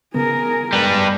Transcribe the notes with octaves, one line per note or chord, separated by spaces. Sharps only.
C#3 B3 G#4 A#4
G3 G#3 B4